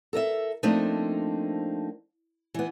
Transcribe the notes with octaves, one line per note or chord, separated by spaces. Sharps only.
A4 A#4 D#5 E5
F3 A3 A#3 C4 D4 D#4
E3 B3